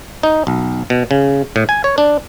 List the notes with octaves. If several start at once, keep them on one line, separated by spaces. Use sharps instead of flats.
D#4
B1
B2
C#3
A2
G#5
C#5
D4